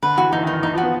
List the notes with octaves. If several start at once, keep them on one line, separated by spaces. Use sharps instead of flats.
D3 B4
E3 F#4
E3 D#4
D#3
D#4
D#3
E3 D#4
F3
F#4
B3